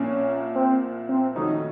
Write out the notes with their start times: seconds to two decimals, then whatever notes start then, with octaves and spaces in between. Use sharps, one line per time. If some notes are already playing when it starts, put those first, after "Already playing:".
Already playing: C2 A#2 F3 A#3 C#4
0.55 C4
1.09 C4
1.35 F2 D#3 A3 C#4 D#4 F#4